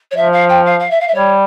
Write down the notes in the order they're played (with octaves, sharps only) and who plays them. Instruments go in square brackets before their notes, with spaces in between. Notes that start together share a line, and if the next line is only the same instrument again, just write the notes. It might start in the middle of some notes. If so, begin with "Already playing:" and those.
[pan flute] C#5
[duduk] F3 [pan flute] E5
[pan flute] F5
G5
F5
F5
E5
F5
E5
[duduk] G3 [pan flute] C#5